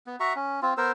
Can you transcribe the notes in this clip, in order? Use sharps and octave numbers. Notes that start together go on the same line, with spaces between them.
B3
F#4 E5 A#5 C#6
C#4
C4 F4
B3 A#4 C5 E6